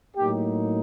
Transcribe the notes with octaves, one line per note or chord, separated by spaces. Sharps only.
A2 F#3 A#3 D#4 G4